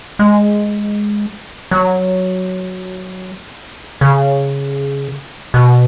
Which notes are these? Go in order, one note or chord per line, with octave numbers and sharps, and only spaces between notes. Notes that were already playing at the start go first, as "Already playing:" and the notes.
G#3
F#3
C#3
B2